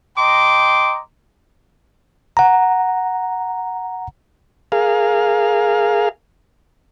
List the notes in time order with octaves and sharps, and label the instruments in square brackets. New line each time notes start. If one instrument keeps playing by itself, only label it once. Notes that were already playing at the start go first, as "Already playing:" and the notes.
[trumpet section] D#5 G5 A#5 C6 D6
[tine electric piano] F#5 A#5
[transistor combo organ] G#4 A#4 F5